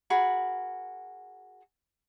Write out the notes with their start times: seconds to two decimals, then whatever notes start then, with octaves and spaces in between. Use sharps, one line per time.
0.10 F#4 G#4 A#4 B5